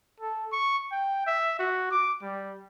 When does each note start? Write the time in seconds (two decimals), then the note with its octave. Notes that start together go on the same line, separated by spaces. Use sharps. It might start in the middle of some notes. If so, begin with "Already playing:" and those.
0.20 A4
0.52 C#6
0.92 G5
1.27 E5
1.59 F#4
1.91 D6
2.22 G3